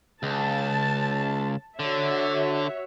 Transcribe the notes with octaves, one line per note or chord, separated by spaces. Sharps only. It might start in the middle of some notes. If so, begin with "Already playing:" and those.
C#2 A5
D3 F#4 C#5 E5